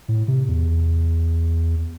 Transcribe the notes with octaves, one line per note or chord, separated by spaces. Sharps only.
A2
C3
E2